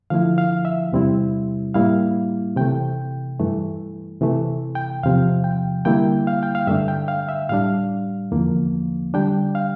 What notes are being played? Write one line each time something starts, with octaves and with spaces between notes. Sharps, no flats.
D3 F3 A3 E4 F5
F5
E5
E2 C3 G3 C4 E4
A2 G3 A#3 E4 F5
C3 E3 A3 G5
G2 E3 A3
C3 E3 A3
G5
E2 C3 F3 F5
G5
D3 G3 A#3 E4 G5
F5
G5
F5
G2 D3 A3 D4 E5
G5
F5
E5
A2 G3 D4 F5
E2 D3 F3 A#3
D3 G3 D4 G5
F5